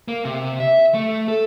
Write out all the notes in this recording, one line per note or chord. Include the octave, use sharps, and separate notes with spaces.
A#3
C3
E5
A3
A4